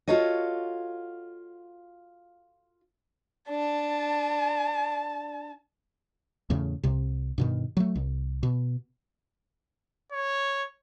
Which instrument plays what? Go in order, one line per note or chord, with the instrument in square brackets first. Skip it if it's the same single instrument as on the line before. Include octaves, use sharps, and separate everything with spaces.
[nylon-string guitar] F4 F#4 A4 C#5 D#5
[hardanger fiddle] D4 [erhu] A5
[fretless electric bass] E2 A2 C#3
C2 C3
G2 B2 D#3
F#3 A3
C2
B2
[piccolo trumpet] C#5